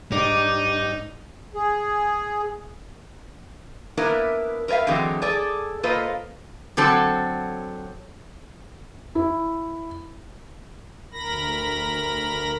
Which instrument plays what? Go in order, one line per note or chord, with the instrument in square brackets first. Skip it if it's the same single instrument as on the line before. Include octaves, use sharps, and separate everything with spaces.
[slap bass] G#2 [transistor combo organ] G3 D4 [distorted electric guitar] D#4 [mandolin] D5
[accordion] G#4
[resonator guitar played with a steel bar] A#3 B3 D4 E4 A#4 B4
A#4 B4 C#5 E5 F5
D3 E3 F#3 G#3 C4
G#4 A4 D5
A#3 F4 A4 B4 C5 D#5
D3 F#3 C4 A4
[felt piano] E4
[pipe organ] D2 A#4 B5 A#6